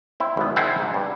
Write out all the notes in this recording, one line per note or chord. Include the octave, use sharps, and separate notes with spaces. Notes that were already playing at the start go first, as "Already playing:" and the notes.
C4 E4
G#1 B3
C4 E4 C5 F#5 G#5 A5
G#2
G2